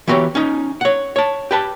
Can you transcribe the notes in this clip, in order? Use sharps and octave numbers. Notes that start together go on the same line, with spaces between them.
E3 B3 F#4 G4 C#5
C#4 D#4
C#5 F#5
C#5 A5
G4 B4 A5